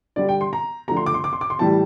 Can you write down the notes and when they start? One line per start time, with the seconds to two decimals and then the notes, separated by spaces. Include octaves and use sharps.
0.16 D3 G3 D5
0.29 G5
0.41 C6
0.53 A#5
0.88 D3 F3 A3 A#5
0.97 C6
1.06 D6
1.14 C6
1.24 D6
1.33 C6
1.41 D6
1.50 C6
1.59 A2 E3 G3 A5